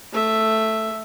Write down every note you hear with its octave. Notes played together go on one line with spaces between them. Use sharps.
A3 E5